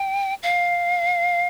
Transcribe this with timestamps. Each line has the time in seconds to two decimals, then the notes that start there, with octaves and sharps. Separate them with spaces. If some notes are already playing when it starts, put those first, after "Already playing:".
Already playing: G5
0.43 F5